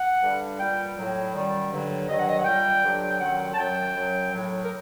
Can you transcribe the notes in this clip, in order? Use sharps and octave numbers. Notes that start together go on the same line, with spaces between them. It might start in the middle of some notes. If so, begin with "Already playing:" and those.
Already playing: F#5
G2 D3 G3
A#2 G3 G5
A2 F#3
F#2 D#3 G3
G2 D3 F#3
G2 D#3 F#3 D#5
F#5
D#5
F#5
A#2 G3 G5
G2 D3 F#3
G5
F#2 D#3 F#3 F#5
A5
F#2 F#3 G5
F#2 F#3
A2 F#3
A#4